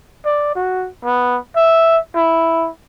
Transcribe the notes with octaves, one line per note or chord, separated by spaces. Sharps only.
D5
F#4
B3
E5
E4